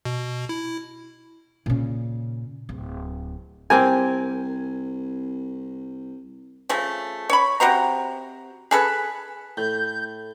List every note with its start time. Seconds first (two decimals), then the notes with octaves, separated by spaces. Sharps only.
0.05 B2
0.49 E4
1.66 A#2 C#3
2.69 D1
3.70 C2 C4 G4 A#4 G#5
6.69 C#3 F3 A3
7.30 C#5 B5
7.60 C3 F#4 C5 A#5
8.71 G#4 A4 B4
9.57 A2 G6